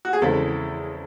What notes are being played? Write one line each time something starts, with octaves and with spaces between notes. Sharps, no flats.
F#4
G#4
E2 C#3 G#3 C4 E4 A4